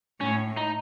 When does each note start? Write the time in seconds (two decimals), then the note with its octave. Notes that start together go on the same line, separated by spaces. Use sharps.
0.21 A2 C#4
0.57 D#4